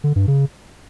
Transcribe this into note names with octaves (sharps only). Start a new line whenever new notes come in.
D3
G2
C#3